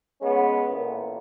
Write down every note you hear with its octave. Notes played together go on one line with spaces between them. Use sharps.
G#3 B3 C#4
A1 A#2